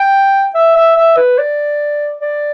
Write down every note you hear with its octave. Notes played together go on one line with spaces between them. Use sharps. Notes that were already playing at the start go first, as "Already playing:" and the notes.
Already playing: G5
E5
E5
E5
B4
D5
D5